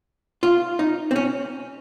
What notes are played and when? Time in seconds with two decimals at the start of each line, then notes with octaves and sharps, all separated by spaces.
0.43 F4
0.79 D#4
1.11 C4
1.16 C#4